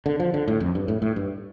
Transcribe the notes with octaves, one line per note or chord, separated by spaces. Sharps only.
D3
F3
D3
A2
F2
G2
A2
A2
G2